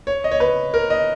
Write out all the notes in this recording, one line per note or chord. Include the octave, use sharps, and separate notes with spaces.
C#5
D#5
C#5
B4
A#4
D#5